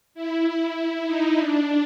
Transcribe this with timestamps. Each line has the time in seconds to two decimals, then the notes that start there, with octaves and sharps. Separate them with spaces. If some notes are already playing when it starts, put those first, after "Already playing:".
0.15 E4
1.06 D#4
1.37 D4